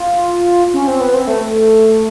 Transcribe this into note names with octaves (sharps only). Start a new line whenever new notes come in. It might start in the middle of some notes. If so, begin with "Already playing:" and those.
Already playing: F4
C#4
C4
B3
C4
A3